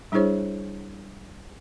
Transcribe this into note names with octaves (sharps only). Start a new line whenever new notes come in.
G3 D4 E4 G#4 C5 C#5